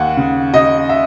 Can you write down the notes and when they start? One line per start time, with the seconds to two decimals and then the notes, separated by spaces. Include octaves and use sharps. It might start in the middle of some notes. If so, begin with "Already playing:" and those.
Already playing: D#2 F#5
0.17 C#3
0.54 C#3 D#5
0.89 E5